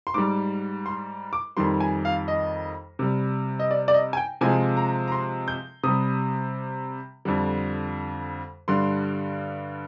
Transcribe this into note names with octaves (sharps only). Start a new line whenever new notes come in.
C6
G#2 G3 D6
C6
D6
F2 D#3 G3 C6
G#5
F5
D#5
C3 G3
D#5
D5
D5
D#5
G#5
G5
C3 F3 G#3 G#5
A#5
A#5
C6
G6
C3 G3 D#6
F2 D3 G3
G2 D3 G3 C6